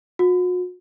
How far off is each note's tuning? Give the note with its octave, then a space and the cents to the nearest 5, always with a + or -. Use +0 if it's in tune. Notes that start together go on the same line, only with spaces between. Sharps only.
F#4 -40